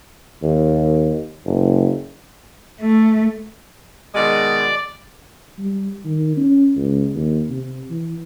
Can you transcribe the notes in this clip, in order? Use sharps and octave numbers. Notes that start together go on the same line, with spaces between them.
D#2
F#1
A3
B2 D#3 G#3 D5
G3
D#3
C#4
C#2
D#2
C3
E3